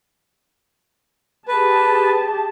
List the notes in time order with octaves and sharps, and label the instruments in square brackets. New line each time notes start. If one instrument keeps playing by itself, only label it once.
[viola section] G4 G#4 A5 [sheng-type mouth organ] B4